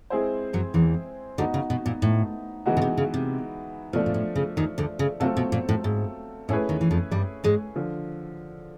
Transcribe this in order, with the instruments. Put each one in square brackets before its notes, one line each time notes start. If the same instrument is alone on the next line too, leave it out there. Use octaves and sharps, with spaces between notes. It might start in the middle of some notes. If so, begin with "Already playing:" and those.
[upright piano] G#3 C4 E4 G#4 C5
[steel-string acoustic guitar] F#2 F#3
E2 E3
[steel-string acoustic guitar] D2 D3 [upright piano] B3 D#4 F#4
[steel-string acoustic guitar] C#3
B2
A#2
A2
[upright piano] E3 G#3 B3 D#4 F#4
[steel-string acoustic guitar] C#3
C3
C#3
C3
[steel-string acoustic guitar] B2 [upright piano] F3 A3 D4
[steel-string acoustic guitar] A#2
A2
C#3
D#2 D#3
D2 D3
C#3
[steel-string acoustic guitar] C3 [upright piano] F#3 A3 C4 F4 A4
[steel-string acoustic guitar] B2
A#2
A2
G#2
[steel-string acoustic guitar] A2 [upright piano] A3 C#4 E4 G#4 B4
[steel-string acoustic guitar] D#2 D#3
E3
F2 F3
G2 G3
G#2 G#3
[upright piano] D3 F3